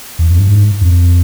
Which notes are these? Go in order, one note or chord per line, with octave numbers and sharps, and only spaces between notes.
E2
F2
G2
G#2
F2